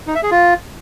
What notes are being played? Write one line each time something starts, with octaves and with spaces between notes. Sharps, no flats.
D#4
E5
G#4
F4